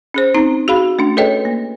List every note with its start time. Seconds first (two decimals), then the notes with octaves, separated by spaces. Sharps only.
0.14 C#4 G#4 C5
0.34 C4 D#4 A#5
0.68 F#4 G#4 F5 B5
0.99 A3 C#4 D4
1.17 G#4 A4 B4 C#5 D#5 G5
1.45 A#3